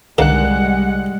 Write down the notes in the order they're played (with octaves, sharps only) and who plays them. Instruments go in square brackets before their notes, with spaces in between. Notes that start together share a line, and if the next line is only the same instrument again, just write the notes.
[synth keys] C2 F#6 [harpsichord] D3 D#3 A#3 [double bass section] G3 G#3 [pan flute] F#5